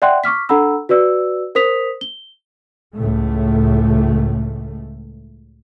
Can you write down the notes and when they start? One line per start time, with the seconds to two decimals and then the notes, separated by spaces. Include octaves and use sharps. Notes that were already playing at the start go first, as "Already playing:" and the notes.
0.02 D5 E5 F#5 G5 C6 F#6
0.24 C#6 D6 F6 B6
0.49 D4 A4 F#5 A#5 B5 E6
0.89 F#4 B4 D5 E6
1.55 A#4 C5 D#6 B6 F7
2.01 G7
2.95 C#2 A2 A3